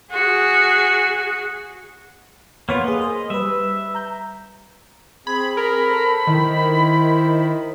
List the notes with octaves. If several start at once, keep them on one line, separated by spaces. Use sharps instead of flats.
F#4 G#4
A#3 B3 F4 B4 C#5
A#3 G#4 D#5
C5
G3 B4 E5
A#5 G6
C4 G#4 B5 G#6
A#4 B5
A4 C5
D#3 E4 C5